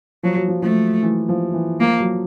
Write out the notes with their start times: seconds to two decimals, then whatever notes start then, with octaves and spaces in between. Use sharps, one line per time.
0.23 F3 F#3
0.37 F#3
0.48 F3
0.62 F3 A3
1.02 E3
1.29 F3
1.54 E3
1.80 F3 A#3
2.00 F#3